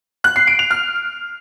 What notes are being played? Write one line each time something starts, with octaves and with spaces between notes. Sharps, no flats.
F#6
C7
D7
F7
F6